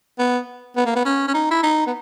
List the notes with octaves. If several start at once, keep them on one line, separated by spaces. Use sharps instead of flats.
B3
B3
A#3
B3
C#4
C#4
D#4
E4
D#4
B3